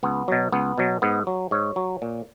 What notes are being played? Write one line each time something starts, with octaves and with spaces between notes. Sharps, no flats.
C#2 B3
B2 F#3
C#2 B3
B2 F#3
G#2 B3
F#3
G#2 C#5
F#3
A#2